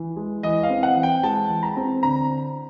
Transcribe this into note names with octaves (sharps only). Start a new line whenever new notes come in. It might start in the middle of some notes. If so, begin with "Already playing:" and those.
Already playing: E3
G#3
E3 D#5
F5
C4
F#5
E3
G5
G#3 A5
E3
A#5
C4
D3 A#5